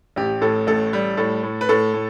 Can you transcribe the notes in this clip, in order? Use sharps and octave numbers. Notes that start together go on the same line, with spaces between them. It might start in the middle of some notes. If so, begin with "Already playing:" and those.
A1 G4
A2 A4
A1 A4
G3
A2 A4
A2
B4
A2 A4
A2